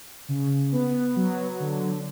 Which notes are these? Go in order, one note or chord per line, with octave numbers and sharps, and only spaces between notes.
C#3
B3
F#3
D3